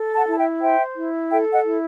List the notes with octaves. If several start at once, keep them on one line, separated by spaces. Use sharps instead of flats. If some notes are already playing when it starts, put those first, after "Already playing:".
Already playing: A4
F#5 A5
E4 A5
E5 G5
C5 E5 G5
E4
A4 E5 G5
D#5 F#5
E4